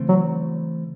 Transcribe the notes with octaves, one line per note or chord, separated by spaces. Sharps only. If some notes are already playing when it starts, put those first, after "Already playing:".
Already playing: C#3 E3 A3 C4
F#3